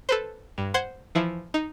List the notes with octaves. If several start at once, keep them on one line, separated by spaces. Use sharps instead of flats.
A4 B4 C5
G2
C5 F#5 G6 G#6
E3 F3 E4
D#4